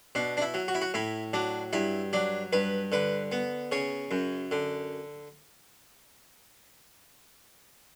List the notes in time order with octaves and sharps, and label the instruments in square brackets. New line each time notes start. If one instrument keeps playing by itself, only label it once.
[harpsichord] B2 D4
D4
E4
F#3
F#4
E4
F#4
A2 E4
F#3 D4
G2 E4
F#3 D4
G2 B4
D3 B4
B3
C#3 C#5
F#2
D3